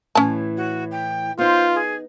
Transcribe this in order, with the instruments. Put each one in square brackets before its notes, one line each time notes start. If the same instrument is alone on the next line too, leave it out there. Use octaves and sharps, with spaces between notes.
[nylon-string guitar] A2 E3 [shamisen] C#4 A5
[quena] F#4
G5
[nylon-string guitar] B3 D#4 [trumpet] F4 [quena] C5
[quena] G#4